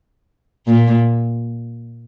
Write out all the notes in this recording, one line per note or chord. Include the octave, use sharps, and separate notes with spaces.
A#2